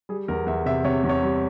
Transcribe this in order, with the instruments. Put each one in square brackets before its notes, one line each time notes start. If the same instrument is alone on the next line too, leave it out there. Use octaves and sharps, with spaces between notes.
[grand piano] G3 G#4
E2 A#4
E2 E5
C3 E5
C3 C#5
E2
C#5
G3